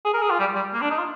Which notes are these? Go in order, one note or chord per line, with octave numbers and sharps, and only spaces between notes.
G#4
A#4
G#4
F4
G3
G3
A#3
D4
D#4
F4